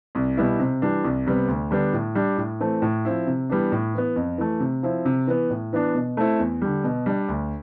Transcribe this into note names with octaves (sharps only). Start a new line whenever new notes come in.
C2
B2 G3 B3 E4
C3
E3 G3 D4
C2
C3 G3 B3
D2
D3 G3 B3 D4
A2
G3 D4
A2
E3 A3 C4
A2
F3 C4 E4
C3
E3 G3 B3 D4
A2
E3 B3
F2
E3 A3
C3
F3 C4 E4
C3
E3 B3
A2
E3 B3 D4
B2
A3 C4 E4
E2
D3 G3
B2
G3 D4
D2